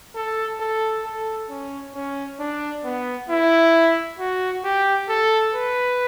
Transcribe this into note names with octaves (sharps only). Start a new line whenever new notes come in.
A4
A4
A4
C#4
C#4
D4
B3
E4
F#4
G4
A4
B4